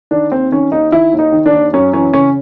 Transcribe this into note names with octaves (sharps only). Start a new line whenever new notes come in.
D#3 D4
D#2 C4
D#3 C#4
D#2 D#4
D#3 E4
D#2
D#4
D#3
D4
D#2
F#2 C#4
E3 C#4
C#3 C#4